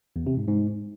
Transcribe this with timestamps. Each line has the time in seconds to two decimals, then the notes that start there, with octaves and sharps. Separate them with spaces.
0.16 E2
0.27 C3
0.37 G#2
0.48 G#2